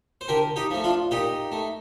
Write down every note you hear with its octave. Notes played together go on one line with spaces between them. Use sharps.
C5
D3 G4 A#4
D#4 G4
F3 A3
D4 F4
A#2 D#4 G4
A3